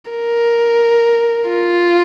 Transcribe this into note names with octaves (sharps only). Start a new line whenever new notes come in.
A#4
F4